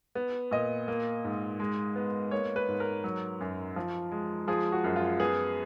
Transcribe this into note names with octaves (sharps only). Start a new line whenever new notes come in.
B3
A#2 D#5
A#3
G#2
G#3
B3
A#3 C#5
B4
G#2
A#4
F#3
F#2
F3
G#3
F3 G#4
F#4
F#2
F4
B3 G#4